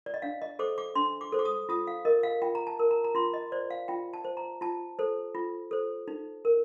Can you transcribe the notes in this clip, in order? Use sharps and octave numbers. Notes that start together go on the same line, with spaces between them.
D5
D#5
D4 F5
D#5
A4 C5 D6
D6
D4 C6
D6
A4 C5
D6
D#6
F4 D#6
F5
A#4 D#5
F5
F4 G5
A#5
A5
A#4
A#5
A#5
F4 C6
D#5
C5 D5
F5
F4 G5
A5
C5
A#5
F4 A5
A4 C5
F4
A4 C5
D#4
A#4